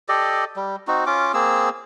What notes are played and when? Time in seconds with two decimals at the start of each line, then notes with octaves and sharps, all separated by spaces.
0.09 G4 A4 D5 D#5
0.56 G3
0.88 C4 D#4 F#4
1.06 C#4 F4 D6
1.34 A#3 C4 G#4 E6